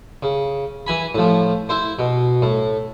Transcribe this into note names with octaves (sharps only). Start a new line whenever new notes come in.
C#3
E3 G#5 B5
A2 F3
E4 C5
B2
A2